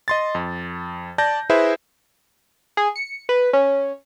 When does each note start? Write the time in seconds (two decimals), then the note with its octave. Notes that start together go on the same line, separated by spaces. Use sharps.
0.08 D#5 C6 A6
0.35 F2
1.18 D5 A5 G6 A#6
1.50 E4 G#4 B4 C5 E5
2.77 G#4
2.96 C#7
3.29 B4
3.53 C#4